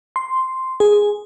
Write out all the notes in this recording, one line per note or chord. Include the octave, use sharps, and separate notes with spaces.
C6
G#4